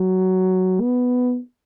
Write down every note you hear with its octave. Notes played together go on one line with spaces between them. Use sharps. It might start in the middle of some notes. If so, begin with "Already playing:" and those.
Already playing: F#3
B3